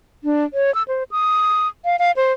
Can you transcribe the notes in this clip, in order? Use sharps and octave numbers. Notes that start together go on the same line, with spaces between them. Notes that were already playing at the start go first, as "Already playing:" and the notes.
D4
C#5
E6
C5
D#6
F5
F5
C5